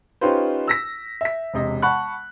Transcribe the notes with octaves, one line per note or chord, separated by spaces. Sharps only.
C#4 D#4 F4 G4 B4 C5
E6 A#6 B6
E5 B6
E1 C3 D#5
F#5 A5 B5 C#6 F#6